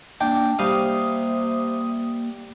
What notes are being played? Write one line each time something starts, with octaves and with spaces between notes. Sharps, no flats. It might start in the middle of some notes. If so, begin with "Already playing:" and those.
A#3 D4 G5
C3 G3 A#3 F5 D#6